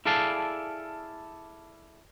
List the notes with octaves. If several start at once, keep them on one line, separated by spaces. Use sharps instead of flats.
E4 G#4 A4 D5 F5 A5